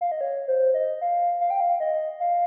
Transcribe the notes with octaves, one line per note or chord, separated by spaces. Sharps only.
F5
D#5
C#5
C5
D#5
F5
F5
G5
F5
D#5
F5